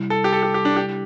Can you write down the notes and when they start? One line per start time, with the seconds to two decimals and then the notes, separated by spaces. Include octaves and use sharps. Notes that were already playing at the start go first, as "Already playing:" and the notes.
Already playing: C3 G3 E4
0.10 A4
0.24 G4
0.33 A4
0.43 G4
0.54 G4
0.65 D4
0.76 G4